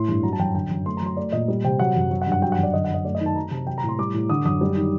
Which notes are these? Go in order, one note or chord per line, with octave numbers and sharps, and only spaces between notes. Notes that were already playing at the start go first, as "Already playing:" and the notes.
Already playing: A2 C6
G2
F#3 A#5
A5
F#2 G5
D3 G5
F#2
A3 C6
A#5
F#3 C6
A3 D5
A#2 D#5
G3
C3 G5
F#3 F#5
F#2
F#3
F#5
G2
F#5
F#3 G5
F#5
F#2 D5
D3 D#5
F#5
F#2 D#5
A3 D5
D#5
D#3
A5
F#3 A#5
C3 A5
F#3 G5
A#5
A2
C6
G3 D6
A2
D3 D#6
F#2 D#6
G3
D#3